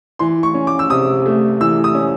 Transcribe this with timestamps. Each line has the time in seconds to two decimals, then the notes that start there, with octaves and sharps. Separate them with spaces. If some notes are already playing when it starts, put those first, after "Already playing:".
0.19 E3 C6
0.43 C#6
0.54 C#4
0.67 D6
0.79 E6
0.89 C3 D#6
1.26 A3
1.61 E3 E6
1.84 D#6
1.95 C#4